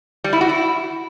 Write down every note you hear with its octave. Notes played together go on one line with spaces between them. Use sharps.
G3
E4
F#4
E4